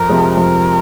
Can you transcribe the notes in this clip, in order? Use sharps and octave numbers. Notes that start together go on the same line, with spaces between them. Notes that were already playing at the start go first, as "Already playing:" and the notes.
Already playing: F2 A#4
C3 F3 G#3
F2 A#4